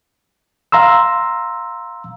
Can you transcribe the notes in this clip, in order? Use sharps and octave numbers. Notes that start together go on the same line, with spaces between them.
F5 A#5 C6 E6